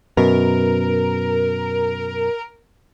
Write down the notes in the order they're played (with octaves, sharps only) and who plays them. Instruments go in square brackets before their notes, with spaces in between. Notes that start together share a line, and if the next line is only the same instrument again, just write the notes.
[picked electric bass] F#2 B2 [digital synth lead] A#4